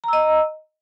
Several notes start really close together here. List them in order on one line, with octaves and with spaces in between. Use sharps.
A#5 E6 D#5